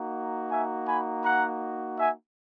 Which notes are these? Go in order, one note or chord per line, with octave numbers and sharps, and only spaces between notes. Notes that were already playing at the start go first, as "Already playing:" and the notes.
Already playing: A#3 D#4 F#4
E5 G#5
G#5 B5
F#5 A#5
E5 G#5